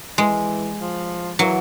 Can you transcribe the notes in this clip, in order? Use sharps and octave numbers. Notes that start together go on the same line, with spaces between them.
E3 G#3
F3
E3 F#3